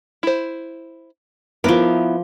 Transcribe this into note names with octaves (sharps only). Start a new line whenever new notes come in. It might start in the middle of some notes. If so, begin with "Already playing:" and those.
E4 C5
F3 B3 D#4 E4 A#4 D6